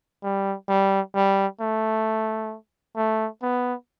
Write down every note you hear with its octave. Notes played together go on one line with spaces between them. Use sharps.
G3
G3
G3
A3
A3
B3